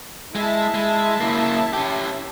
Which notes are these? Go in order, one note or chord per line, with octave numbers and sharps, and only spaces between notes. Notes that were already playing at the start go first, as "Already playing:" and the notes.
G#3 E4 E5 A5
G#3
C#3 A#3
C#4 G4